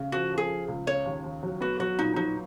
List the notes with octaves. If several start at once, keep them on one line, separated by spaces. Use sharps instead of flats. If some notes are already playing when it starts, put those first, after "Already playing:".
Already playing: C#3
F3 F#4
F3
G#4
F3
C#2
C#3 C#5
D#2
D#2
F#3
B3 F#4
F#3 F#4
A#2 D#4
F#3 D#4